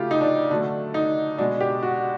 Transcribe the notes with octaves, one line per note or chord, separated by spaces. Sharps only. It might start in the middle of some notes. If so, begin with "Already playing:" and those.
Already playing: C#3 F#3 A3 F4 G4
D#4
D4
D3 F#3 A3 D4
D#4
B2 G#3 D4
G4
F#4